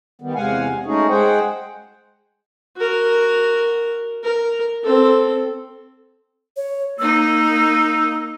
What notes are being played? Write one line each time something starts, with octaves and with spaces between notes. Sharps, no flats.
D#3 G3 B3
E2 C3 G#3 F5 F#5 G#5
G#3 A3 C#4 D#4 F#4 G#4
G#3 G#4 C5 F#5 G5
F#4 A#4
A#4
C4 A4
C#5
A#3 D#4 E6